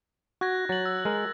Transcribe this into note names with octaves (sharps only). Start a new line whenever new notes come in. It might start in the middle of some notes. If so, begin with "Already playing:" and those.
F#4 F#6 G#6 A#6
F#3 A6 F#7
E6
G#3 A#4